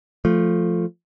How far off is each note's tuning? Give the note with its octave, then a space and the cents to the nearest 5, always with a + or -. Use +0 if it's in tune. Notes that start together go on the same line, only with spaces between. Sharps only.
F3 +0 A3 +0